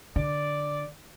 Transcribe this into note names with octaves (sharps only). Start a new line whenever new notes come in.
D3 D5